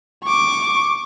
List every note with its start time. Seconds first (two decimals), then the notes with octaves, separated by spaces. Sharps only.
0.24 C#6 D6